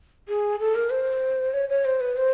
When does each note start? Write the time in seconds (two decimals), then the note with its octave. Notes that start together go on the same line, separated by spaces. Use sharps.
0.28 G#4
0.59 A4
0.75 A#4
0.90 C5
1.54 C#5
1.69 C#5
1.85 C5
2.01 B4
2.17 C5